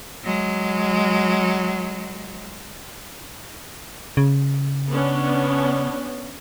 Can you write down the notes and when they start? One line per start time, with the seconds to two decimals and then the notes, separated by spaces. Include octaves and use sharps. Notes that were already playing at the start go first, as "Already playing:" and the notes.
0.24 F#3 G#3
4.17 C#3
4.90 B3 C#4 D4